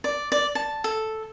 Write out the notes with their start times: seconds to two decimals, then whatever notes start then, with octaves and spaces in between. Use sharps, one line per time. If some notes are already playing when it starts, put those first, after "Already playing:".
0.04 D5
0.32 D5
0.55 A5
0.84 A4